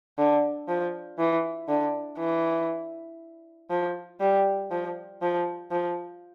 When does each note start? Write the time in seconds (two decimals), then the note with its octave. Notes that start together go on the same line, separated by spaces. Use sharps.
0.18 D3
0.68 F3
1.19 E3
1.68 D3
2.19 E3
3.70 F3
4.21 G3
4.71 F3
5.22 F3
5.71 F3